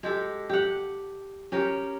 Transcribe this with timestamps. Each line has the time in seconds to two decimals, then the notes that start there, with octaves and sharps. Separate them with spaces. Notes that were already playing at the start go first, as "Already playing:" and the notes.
0.03 G#3 G4 A4
0.50 G4 F#5
1.52 C#4 G4 A#4